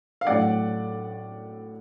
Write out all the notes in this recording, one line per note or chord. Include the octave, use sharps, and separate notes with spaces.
F5
A2 F#3 A3 D5 F#5